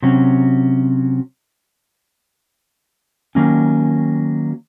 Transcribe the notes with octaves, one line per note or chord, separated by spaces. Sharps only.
C3 F#3 C#4
D#3 F#3 A#3 C#4